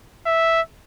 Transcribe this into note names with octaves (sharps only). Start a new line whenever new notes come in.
E5